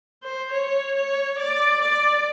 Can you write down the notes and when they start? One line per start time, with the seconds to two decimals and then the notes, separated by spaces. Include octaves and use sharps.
0.23 C5
0.52 C#5
0.95 C#5
1.39 D5
1.82 D5